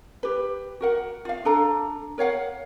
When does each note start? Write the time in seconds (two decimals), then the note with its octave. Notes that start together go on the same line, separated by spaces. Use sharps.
0.23 G4 B4
0.81 F#4 A#4 F#5
1.25 F4 F5
1.45 D4 A4 A#5
2.18 A#4 C#5 F5 F#5